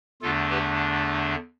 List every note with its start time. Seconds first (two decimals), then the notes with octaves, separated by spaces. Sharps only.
0.22 E2 D3 A3 D4 F4 A4
0.50 G4 B4